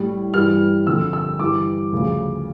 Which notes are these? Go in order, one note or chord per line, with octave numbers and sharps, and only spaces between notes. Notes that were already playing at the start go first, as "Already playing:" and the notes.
Already playing: A2 G3
G2 E3 G3 F6
F2 D3 G3 E6
E6
G2 E3 G3 D6
D2 C#3 F3